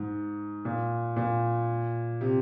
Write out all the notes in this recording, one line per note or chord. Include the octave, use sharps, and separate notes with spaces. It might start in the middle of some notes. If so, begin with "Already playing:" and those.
Already playing: G#2
A#2
A#2
C3